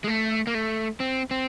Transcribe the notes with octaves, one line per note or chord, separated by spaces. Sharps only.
G#3
A3
A#3
A3
C4
C4